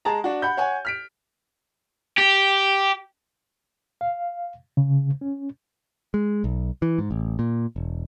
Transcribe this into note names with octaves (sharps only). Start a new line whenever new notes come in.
G#3 G#4 A5 A#5
D4 F#4
F#5 B5 G6
C#5 F#5 G#5
F6 B6 D7
G4
F5
C#3
C#4
G#3
B1
E3
G#2
A1
A#2
E1